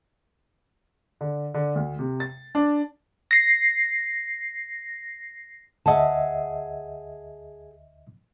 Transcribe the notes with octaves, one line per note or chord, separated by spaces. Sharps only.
D3
D3
D2
C3
A6
D4
A#6 C7
D2 G#4 D#5 E5 F#5 A5